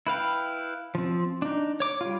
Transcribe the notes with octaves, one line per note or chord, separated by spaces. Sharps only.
E4 B4 F5 G5
F3 C4
D4 D#4
C#5 D6
G3 F4